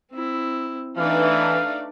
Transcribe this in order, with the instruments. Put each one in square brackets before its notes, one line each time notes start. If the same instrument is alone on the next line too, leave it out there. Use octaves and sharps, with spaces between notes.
[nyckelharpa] C4 E4
[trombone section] E3 [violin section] A3 D#4 D5 [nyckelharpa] D4 B4 [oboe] F5